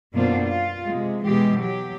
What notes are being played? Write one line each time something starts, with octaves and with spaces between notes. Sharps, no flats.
F#2 B2 A#3 D4 F4 C5
F4
C3 G#3
B2 E3 G#3 G4
F#3 G4